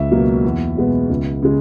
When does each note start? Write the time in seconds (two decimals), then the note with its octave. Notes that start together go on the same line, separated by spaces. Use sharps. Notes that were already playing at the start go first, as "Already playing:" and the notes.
Already playing: C#2 E5
0.11 B2 F#3 A#3
0.45 E2
0.77 B2 G#3 B3
1.09 C#2
1.42 C#3 G#3